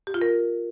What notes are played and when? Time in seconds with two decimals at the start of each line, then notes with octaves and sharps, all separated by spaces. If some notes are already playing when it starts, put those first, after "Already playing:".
0.07 G4
0.14 F4
0.22 A#4